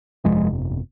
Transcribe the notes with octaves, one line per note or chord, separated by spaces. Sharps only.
G1 F2 C3 F3 G#3